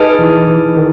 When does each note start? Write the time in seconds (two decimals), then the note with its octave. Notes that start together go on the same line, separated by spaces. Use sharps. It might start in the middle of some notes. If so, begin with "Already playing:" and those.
Already playing: D#4 G#4 B4 D#5 A5
0.18 E3
0.47 E3
0.76 D#3